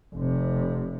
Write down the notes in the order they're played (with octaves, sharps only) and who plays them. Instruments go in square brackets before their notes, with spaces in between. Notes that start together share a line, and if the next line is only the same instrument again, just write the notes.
[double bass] F1 C3